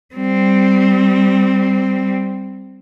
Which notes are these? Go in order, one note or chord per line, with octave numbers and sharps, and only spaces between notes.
G3 C4